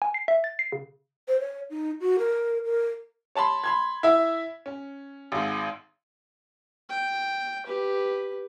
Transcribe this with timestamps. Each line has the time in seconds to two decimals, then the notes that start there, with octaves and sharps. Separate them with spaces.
0.02 G#5
0.14 C7
0.28 E5
0.44 A6
0.59 C7
0.72 C#3
1.28 C5
1.40 C#5
1.70 D#4
2.00 F#4
2.19 A#4
2.65 A#4
3.35 C#5 A5 B5 C6
3.64 B5 C6 G#6
4.03 E4 E5
4.66 C#4
5.32 G#1 G#2
6.89 G5
7.66 G4 B4